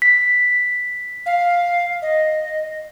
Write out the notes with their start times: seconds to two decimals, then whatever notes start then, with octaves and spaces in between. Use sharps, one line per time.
0.02 B6
1.26 F5
2.02 D#5